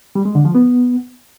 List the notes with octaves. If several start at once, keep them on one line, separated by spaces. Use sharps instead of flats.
G3
G#3
D3
F3
B3